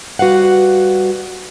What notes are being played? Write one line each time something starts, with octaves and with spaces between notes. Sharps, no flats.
G3 F#4 B4 F5 F#5